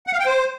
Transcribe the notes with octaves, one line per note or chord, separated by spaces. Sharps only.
F#5
F5
G5
C5